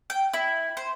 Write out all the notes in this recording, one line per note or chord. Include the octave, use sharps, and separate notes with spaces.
G5
E4
C5